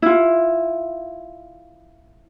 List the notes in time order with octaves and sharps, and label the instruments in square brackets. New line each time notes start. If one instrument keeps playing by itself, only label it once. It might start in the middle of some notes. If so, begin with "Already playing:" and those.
[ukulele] E4 F4